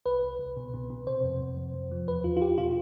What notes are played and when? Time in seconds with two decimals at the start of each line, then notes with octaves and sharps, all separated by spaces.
0.06 C2 B4
0.23 C2
0.39 C2
0.57 B2
0.74 B2
0.90 B2
1.07 C3 C5
1.24 F2
1.41 F2
1.57 F2
1.74 F2
1.91 F3
2.08 E2 B4
2.24 E2 F4
2.37 F4
2.41 E2 G4
2.58 B2 F4